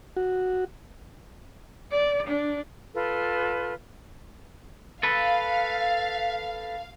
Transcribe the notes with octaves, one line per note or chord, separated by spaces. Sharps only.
F#4
D5
D4
F4 A4 B4
A4 B4 F5